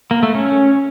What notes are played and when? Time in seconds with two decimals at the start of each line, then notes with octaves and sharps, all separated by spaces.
0.11 A#3
0.23 A3
0.35 C#4